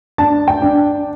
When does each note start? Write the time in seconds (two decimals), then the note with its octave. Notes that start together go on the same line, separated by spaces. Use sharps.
0.18 D4 A5
0.48 G5
0.62 D4